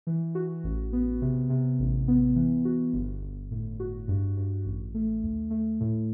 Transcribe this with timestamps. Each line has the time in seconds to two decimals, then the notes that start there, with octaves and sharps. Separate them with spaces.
0.07 E3
0.35 F#4
0.64 A1
0.93 B3
1.21 C3
1.50 C3
1.79 A1
2.08 B3
2.36 E3
2.65 F#4
2.93 G1
3.22 G1
3.51 A2
3.80 F#4
4.08 G2
4.37 G2
4.65 A1
4.94 A3
5.23 D2
5.50 A3
5.80 A2